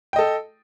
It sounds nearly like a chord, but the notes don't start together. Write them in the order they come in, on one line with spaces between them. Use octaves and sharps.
G5 D#5 A4